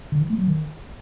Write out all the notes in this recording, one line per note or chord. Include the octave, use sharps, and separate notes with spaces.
D3
E3
A3
F#3
D#3